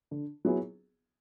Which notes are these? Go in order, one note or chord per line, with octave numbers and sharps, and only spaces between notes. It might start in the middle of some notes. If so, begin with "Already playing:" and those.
D3
F#3 B3 E4 G#4